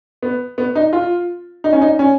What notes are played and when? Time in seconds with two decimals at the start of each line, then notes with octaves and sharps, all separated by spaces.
0.23 B3
0.58 B3
0.75 D#4
0.93 F4
1.64 D#4
1.73 C#4
1.82 D#4
1.99 C#4